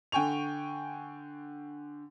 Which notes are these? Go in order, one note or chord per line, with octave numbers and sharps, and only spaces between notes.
D3 G5 G#5 C#6 F7